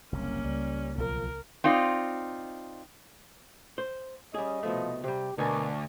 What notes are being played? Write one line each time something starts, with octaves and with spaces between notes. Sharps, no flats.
F#1 C2 A#3 C#4
C#2 G3
B1 D#3 F3 A#4
C4 D#4 F4 D5
C5
G3 C#4 G#4 D#5
C2 B2 F3 A3
C3 G3 G4
D2 B2 D4 A#4 G#5